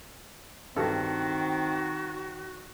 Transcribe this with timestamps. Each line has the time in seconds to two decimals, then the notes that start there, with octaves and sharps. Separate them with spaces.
0.76 G2 D#3 C4 F#4 A4